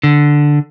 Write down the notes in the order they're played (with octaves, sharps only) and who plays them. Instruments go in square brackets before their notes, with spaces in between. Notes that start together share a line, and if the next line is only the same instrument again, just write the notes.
[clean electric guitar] D3